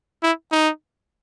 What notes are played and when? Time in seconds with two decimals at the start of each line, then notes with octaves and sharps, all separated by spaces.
0.23 E4
0.52 D#4